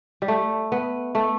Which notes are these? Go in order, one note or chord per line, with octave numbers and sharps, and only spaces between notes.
G3
A3
B3
A3